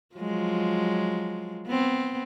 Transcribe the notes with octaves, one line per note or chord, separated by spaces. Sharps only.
F3 F#3 G#3
B3 C4